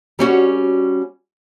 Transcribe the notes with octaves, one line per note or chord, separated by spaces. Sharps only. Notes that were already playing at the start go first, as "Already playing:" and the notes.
G3 C#4 F#4